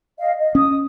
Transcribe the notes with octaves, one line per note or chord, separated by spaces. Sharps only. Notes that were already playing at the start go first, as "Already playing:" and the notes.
D#5 F5
D#5
C#4 D#6